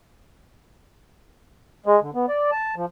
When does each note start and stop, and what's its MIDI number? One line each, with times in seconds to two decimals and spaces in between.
1.86 2.00 56
2.02 2.10 50
2.15 2.26 59
2.29 2.51 74
2.51 2.75 81
2.76 2.86 53